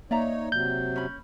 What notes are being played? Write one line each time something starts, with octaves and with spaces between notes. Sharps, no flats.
A#3 D#4 C#5 D5 E5 A#5
C3 F#3 G6
C#4 B5